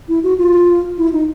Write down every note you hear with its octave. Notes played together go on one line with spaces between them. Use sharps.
E4
F#4
F4
E4
D#4